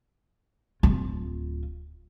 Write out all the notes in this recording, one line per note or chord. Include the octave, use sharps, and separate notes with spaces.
D1 F4